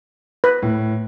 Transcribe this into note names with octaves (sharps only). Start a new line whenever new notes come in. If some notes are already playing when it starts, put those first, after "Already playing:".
B4
A2